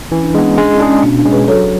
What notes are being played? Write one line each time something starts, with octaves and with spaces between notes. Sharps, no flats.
E3 C#4
D4
G#3 B3 D4
C#4
G#3 D4
C#4 E4
D4 G#4
C#4
B2 D4
D4
G#3 C#4
G#4 B4
F#3 A4 C#5